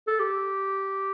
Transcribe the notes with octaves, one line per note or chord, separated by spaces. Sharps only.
A4
G4